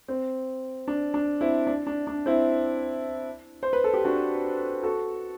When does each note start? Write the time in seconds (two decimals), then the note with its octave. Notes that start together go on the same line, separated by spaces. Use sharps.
0.08 C4
0.88 D4
1.14 D4
1.41 C4 E4
1.67 D4
1.87 D4
2.07 D4
2.26 C4 E4
3.63 C5
3.73 B4
3.84 A4
3.94 G4
4.04 D4 F#4
4.83 F#4 A4